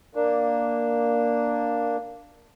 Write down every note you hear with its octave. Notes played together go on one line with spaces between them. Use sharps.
A#3 D4